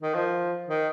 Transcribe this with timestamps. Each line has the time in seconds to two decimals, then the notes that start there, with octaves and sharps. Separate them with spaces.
0.02 D#3
0.14 F3
0.69 D#3